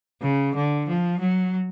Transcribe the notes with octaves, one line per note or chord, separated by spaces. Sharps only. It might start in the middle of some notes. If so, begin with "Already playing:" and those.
C#3
D3
F3
F#3